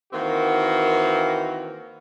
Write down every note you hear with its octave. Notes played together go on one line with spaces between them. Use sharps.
D#3 E3 A#3 C4 F#4